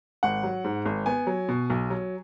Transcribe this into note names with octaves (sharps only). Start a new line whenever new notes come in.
G#1 F#5
F#3
G#2
G#1
B3 G#5
F#3
B2
B1
F#3